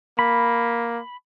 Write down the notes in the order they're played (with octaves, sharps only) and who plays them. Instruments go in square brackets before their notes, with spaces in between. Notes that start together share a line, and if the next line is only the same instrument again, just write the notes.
[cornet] A#3 [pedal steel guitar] B5